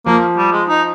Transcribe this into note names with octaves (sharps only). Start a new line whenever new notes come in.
F3 A#3
G3
G#3
D#4